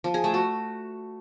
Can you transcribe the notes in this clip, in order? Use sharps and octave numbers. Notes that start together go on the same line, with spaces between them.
F3
G#4
A3
F#4